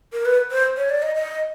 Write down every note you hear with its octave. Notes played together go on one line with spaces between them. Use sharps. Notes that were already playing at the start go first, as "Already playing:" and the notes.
A#4
B4
C5
C#5
D5
D#5
D#5